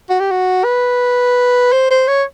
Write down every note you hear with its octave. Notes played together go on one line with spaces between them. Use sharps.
F#4
G4
F#4
B4
C5
C5
C#5